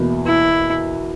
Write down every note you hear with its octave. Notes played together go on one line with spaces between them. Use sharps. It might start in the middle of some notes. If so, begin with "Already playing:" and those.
Already playing: E2 B2 A#3 E4
E4